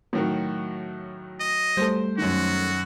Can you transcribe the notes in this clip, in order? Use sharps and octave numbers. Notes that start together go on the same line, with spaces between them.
A2 D#3 F#3 F#4
D#5
G3 A3 A4 C5
F#2 D#3 F#4